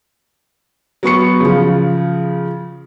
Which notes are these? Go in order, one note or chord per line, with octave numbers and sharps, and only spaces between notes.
F#3 B3 C#6 C#7
C#3 F3